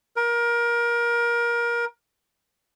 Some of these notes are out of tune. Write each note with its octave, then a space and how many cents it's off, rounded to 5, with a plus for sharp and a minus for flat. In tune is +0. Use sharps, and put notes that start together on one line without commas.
A#4 +25